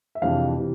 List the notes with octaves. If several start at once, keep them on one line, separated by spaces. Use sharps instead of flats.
E5
F2 C3 E3 G#3 D4 F5
C3 E3